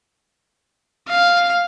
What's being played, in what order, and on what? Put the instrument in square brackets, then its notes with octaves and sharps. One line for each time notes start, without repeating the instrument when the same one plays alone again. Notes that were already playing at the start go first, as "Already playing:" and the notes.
[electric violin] F5